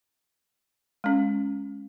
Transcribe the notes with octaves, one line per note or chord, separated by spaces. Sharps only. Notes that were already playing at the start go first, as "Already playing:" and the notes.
G#3 C#4